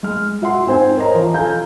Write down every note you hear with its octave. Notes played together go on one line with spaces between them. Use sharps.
G#3 F6
F#4 E5 F#5 C6
G#2 C4 C5 G#5
A#4 C5 C#5 D#5 A#5
E3 F3
A4 F5 G#5 A#5 G6